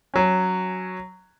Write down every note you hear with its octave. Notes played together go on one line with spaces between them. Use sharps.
F#3 C#4